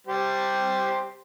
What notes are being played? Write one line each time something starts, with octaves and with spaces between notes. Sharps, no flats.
G3 G4 C5